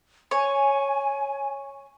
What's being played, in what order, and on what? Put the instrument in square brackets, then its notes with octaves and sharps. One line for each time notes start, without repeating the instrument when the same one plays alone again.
[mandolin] C#5 [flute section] G#5